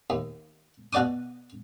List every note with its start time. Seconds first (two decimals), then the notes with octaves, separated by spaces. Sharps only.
0.10 D#2
0.93 B2 F#4 D5 D6 D#6